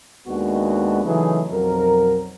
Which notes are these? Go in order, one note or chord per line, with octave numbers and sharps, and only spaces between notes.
D#2 G#3 B3 D4 F#4
C#3 E3 F#3 A3 D#4 G#4
B1 F2 F#3 A#4